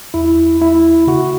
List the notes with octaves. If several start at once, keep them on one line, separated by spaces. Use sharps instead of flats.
E2 E4
A3 E4
C#3 F#4